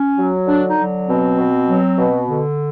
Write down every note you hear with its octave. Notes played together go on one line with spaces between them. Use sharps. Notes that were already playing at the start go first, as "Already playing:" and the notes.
Already playing: C#4
F#3
D3 D4
D#4
F#3
B2 C4
B2
F#3
B2
D3